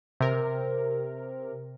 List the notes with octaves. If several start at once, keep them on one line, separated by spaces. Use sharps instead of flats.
C3 A#4